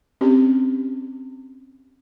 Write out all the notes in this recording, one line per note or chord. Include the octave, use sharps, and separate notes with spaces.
C4 C#4 G4